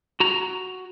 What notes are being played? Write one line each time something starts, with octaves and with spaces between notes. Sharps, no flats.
F#4 A#5